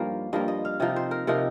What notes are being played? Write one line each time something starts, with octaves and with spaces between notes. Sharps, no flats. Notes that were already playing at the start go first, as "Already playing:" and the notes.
Already playing: G2 F3 A#3 D#4
G2 F3 A#3 D#5
D#5
F5
C3 F3 D#4 D#5
C5
A#4
C3 F3 D#4 A#4